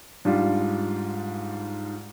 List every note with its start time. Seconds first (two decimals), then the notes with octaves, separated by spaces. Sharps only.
0.25 G#2 G3 D4 F4